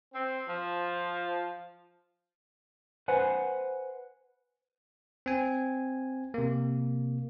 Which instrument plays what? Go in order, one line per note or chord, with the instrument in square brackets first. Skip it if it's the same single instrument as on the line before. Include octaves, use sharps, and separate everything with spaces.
[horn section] C4
F3
[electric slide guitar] B4 C5 F#5 G#5
[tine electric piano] C4 G#5
C3 A#3